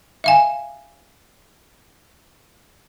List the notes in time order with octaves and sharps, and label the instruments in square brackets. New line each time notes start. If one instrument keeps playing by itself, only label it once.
[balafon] E5 F5 G#5